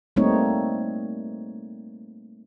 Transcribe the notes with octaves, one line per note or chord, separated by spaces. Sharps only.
G3 A3 A#3 C4 D#4 C#5